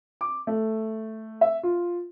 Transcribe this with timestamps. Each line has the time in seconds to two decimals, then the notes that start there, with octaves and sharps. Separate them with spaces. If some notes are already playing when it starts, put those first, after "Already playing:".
0.21 D6
0.47 A3
1.41 E5
1.63 F4